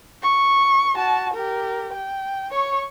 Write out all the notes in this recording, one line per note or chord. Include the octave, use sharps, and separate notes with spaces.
C#6
F#4 A5
G4 A#4
G5
C#5 C#6